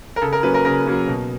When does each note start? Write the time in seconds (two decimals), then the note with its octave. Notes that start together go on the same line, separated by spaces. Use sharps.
0.16 A#4
0.22 C#3 A4
0.33 A#4
0.43 F#3 A#3 C#4 B4
0.54 A#4
0.65 C#3 A#4
0.86 F#3 A#3 C#4
1.08 B2